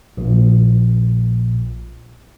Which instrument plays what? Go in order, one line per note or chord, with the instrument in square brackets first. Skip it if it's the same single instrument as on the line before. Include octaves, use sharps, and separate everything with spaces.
[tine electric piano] A#1 A#2